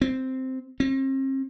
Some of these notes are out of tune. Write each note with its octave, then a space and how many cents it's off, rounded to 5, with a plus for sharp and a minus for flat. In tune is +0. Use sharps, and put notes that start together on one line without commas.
C4 -5
C4 +40